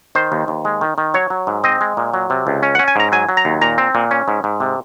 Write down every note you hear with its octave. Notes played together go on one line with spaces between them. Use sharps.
D#3 C5
D#2
D#2
G#3
D#3
D#3
F#3 C#5
F#3
G#2
C4 D#5
G#3
A#2
F#3
C3
C#2
C#4
F#5
C#4
G#5
G#2 A#5
F#3 G#5
F#3
A#5
D#2
A#2 A#5
C4
A#2
C#4
G#2
G#2
C3